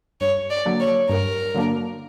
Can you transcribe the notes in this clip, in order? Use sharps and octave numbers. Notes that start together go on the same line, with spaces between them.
G2 C#5
D5
D3 F#3 A#3 D4
C#5
G2 A#4
D3 F#3 A#3 D4